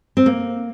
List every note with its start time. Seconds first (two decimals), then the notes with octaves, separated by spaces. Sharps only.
0.17 C4
0.26 A#3